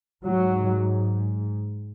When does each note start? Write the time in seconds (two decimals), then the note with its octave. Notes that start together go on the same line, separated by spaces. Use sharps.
0.23 G#2 F#3